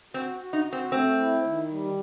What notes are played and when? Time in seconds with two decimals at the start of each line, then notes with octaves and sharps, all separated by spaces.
0.14 C4 F#4
0.40 F#4
0.53 D#4
0.66 F#4
0.73 C4
0.92 A3 C4
1.18 E4
1.44 D#3
1.70 G3